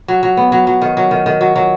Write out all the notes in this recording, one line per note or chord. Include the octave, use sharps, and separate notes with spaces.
F#3
F#3
B3
F#3
F#3
D#3
F#3
D#3
D#3
F#3
F#3